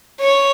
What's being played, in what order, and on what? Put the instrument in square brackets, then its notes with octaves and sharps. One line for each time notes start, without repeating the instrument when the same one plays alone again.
[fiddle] C#5